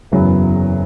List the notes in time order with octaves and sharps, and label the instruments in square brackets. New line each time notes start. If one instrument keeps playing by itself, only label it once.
[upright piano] F#1 E2 C#3 F#3 B3